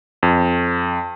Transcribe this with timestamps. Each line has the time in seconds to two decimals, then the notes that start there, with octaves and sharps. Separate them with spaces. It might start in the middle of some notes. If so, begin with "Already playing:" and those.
0.23 F2